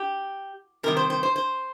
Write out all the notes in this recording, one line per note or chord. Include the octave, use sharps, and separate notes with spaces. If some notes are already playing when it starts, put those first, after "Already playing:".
Already playing: G4
C3 D#3 G3 A#4
C5
C5
C5
C5